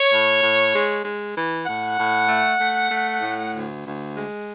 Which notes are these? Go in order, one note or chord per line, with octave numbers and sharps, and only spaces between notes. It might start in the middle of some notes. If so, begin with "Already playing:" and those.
Already playing: C#5
A2
A2
G#3
G#3
E3
A2 F#5
A2
A3
A3
A3
A2
D2
D2
G#3